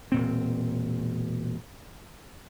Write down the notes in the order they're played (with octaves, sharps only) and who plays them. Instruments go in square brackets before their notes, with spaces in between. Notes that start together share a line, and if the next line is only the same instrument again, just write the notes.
[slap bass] E1 A#2 C4